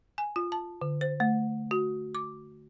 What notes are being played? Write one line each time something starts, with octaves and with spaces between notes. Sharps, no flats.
G#5
F4
A5
D3
C5
A3
F#4
D6